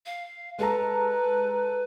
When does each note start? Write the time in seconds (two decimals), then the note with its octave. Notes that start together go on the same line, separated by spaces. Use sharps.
0.06 F5
0.59 G#3 A4 B4 A#5